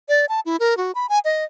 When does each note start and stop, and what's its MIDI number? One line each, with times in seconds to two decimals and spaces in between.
0.09 0.26 74
0.29 0.40 81
0.46 0.56 64
0.60 0.77 70
0.77 0.92 66
0.95 1.07 83
1.09 1.19 80
1.25 1.44 75